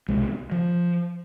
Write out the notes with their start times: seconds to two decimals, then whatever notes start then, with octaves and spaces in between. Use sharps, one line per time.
0.08 C2 B2 G#3
0.52 F3